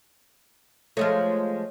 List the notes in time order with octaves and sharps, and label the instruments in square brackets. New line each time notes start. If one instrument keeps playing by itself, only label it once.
[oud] F3 G#3 A3 [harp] C#5 D#5